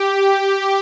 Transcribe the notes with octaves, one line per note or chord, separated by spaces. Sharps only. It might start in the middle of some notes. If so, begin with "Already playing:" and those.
Already playing: G4